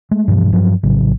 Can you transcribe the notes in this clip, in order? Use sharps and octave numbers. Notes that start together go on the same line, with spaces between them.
G#3 A3
G2 B2 E3 F3
G2 F3 F#3
A#1 A2 C#3 F#3